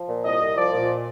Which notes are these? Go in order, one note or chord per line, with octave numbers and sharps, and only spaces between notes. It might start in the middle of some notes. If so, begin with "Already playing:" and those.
Already playing: F3
A#2
C2 D#5
C2
F3 D5
A#2